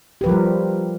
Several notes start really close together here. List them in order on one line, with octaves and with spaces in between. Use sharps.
G4 B4 F3 A#4 G3